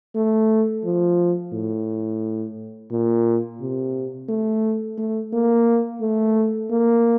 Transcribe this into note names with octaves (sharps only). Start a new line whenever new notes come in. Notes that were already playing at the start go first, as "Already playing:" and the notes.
A3
F3
A2
A#2
C3
A3
A3
A#3
A3
A#3